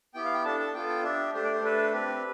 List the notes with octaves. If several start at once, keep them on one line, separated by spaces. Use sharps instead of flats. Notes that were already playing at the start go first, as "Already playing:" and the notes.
B3 E4 G4 G5
F5
G5
D4 A4 A5
A5
B3 F4 A4 G5
G5
D4 G4 E5
A3 D4 G4 C5
D5
C5
A3 D4 A4 B4
C4 G4 B4